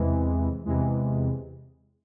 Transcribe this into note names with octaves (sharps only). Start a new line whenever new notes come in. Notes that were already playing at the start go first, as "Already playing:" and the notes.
Already playing: E2 C3 E3 G#3
E2 C3 E3 G#3